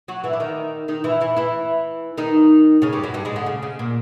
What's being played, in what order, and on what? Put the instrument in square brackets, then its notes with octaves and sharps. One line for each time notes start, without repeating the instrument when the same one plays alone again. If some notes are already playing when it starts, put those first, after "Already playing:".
[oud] F#3 F#4
E3 E4
D4
D#3 D#4
D#3 D#4
E3 E4
E3 E4
E3 E4
D#3 D#4
C#3 C#4
G2 G3
F#2 F#3
G2 G3
G#2 G#3
D2 D3
C#3
C#3
A#2